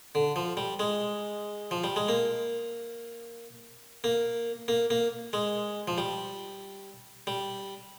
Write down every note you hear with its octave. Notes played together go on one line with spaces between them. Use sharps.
D3
F3
G3
G#3
F3
G3
G#3
A#3
A#3
A#3
A#3
G#3
F3
G3
G3